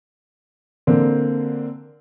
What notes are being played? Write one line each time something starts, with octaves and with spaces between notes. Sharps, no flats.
D3 A#3 C4